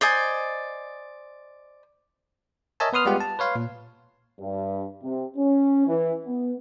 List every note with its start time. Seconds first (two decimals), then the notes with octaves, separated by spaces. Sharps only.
0.01 C5 D5 D#5 G#5
2.80 A#4 C#5 D#5 E5 G#5 A5
2.93 B3 B4 C6 D#6 F6
3.05 G3 G#3 B3 F4 G4 F#5
3.20 A5
3.39 B4 C#5 F5 C6
3.55 A#2
4.40 G2
5.04 C3
5.37 C#4
5.87 E3
6.26 B3